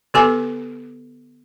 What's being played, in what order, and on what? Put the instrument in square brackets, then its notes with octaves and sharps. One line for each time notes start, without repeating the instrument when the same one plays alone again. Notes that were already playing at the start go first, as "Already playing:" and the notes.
[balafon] D3 B3 G4 A4 G#5 D6